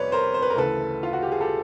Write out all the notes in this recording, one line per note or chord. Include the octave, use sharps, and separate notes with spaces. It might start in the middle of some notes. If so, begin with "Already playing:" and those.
Already playing: G1 F2 C3 B4 C#5 D5
A#4 C5
C5
B4
A#4
D2 C#3 E3 A4 B4
F4
F#4
G4
G#4
G4 A4